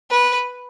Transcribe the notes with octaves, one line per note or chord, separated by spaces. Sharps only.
B4